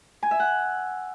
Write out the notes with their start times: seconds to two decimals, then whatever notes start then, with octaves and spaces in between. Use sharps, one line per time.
0.23 G#5
0.31 E5
0.40 F#5